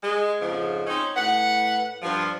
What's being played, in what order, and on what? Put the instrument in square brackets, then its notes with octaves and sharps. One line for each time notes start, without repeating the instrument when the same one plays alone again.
[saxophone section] G#3
F2 G#2 C#3 F3
C4 C#4 D#4
A2 B4 F#5
G2 F3